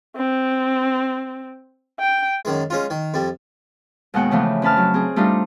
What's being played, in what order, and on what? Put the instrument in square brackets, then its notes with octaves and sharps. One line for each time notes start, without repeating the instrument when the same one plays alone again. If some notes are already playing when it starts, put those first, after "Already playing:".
[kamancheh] C4
G5
[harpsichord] F#2 D#3 G#3
G#3 C#4 F4
D#3
F2 G3
[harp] D#2 B2 G#3 F#5 G5
C#3 E3 F3 A3
F2 C#4 B4 A5 F6
F#3
C4 G#4
G3 A3 D4 D#4 F4